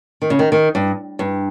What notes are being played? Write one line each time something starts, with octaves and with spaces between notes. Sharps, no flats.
D#3
C#3
D#3
D#3
G2
G2